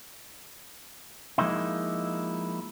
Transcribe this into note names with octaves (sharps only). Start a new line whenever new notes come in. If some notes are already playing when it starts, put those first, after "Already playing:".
F3 G#3 A#3 D#4 E4